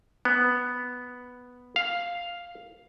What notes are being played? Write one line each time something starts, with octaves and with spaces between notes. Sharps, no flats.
B3
F5